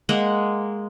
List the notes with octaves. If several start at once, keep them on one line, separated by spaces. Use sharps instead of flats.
G#3 A#3 F#5